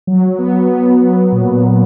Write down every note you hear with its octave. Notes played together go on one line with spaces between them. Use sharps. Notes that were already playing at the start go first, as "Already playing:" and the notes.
F#3
B3
B3
B3
A#2